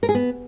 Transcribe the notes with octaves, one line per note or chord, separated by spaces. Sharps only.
A#4
G#4
B3